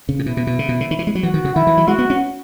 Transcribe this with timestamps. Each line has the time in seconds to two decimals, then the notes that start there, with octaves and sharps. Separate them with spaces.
0.09 C#3
0.19 A2
0.25 B2 E4
0.37 B2
0.47 B2
0.59 C#3
0.69 B2
0.80 C#3
0.91 D#3
0.99 E3
1.07 G#3
1.15 F#3
1.23 E3 F#4
1.34 D#3
1.45 C#3
1.55 D#3 E4
1.67 E3
1.77 F#3
1.88 G#3 F#4
1.99 B3
2.10 C#4